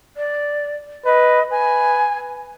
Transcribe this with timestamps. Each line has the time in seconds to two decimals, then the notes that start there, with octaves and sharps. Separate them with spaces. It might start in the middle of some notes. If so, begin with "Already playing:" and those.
0.17 D5
1.06 B4 D#5
1.51 B4 G#5